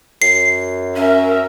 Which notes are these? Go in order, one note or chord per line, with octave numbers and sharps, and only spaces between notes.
F#2 C7
C#4 A#4 E5